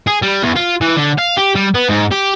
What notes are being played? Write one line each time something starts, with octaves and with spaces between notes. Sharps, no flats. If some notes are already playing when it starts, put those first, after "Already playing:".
G#4
G3
E2
F4
E3
D3
F5
G4
G3
B3
G#2
G4